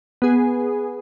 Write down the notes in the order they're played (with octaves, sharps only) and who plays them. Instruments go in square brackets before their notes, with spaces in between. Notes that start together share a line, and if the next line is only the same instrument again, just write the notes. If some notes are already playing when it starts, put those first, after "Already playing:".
[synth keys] B3 G#4